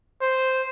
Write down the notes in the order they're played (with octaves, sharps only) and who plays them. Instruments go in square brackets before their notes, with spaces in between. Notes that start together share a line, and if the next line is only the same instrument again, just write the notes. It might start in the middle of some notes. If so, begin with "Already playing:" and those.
[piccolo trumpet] C5